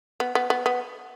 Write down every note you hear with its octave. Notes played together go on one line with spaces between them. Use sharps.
B3
B3
B3
B3